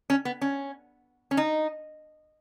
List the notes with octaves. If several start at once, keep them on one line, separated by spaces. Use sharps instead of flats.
C#4
B3
C#4
C#4
D#4